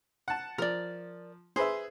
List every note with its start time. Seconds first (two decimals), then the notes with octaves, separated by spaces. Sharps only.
0.28 F#5 A5
0.58 F3 A#4 D5
1.56 G#4 B4 C5 E5